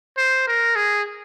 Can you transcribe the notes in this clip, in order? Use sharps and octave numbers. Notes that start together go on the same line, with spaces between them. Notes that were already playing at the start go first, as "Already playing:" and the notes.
C5
A#4
G#4